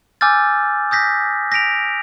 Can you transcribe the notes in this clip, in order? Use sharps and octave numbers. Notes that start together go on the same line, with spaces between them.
G#5 D6 E6 F6 G6 A6
D#6 G6 A#6 B6
A#6 B6 D7 F7